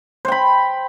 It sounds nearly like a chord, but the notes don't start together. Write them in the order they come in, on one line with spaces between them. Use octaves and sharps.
C5 G5 B5